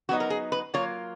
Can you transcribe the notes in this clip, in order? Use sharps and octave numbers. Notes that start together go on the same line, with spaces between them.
F#3 B3 D#4 F#4
A#4
G#4
B4
F#3 A#3 F4 C#5